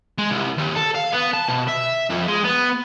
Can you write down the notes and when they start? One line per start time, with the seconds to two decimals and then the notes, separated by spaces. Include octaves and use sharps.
0.18 G#3
0.31 C2
0.57 D#2
0.75 A4
0.95 F5
1.13 B3
1.33 A5
1.48 B2
1.68 E5
2.10 F2
2.28 G#3
2.44 B3